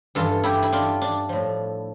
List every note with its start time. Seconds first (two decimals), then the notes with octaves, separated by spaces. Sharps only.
0.15 G2 E3 F4 A4
0.44 E4 G4
0.63 E4
0.72 D4 F4
1.01 D4
1.29 A2 F3